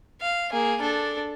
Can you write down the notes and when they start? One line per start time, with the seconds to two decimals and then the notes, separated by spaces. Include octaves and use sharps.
0.21 F5
0.53 A#3 G#4
0.81 D4 A4